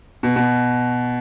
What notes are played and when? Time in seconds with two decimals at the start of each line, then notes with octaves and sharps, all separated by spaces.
0.23 B2
0.36 B2